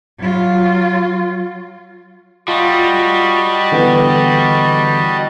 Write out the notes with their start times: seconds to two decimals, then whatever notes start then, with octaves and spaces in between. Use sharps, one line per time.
0.18 F#3 F4
2.48 G3 F4 F#4 D#5 A5
3.72 D3 E3 B3